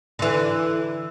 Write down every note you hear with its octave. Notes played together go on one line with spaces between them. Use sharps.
D3 E3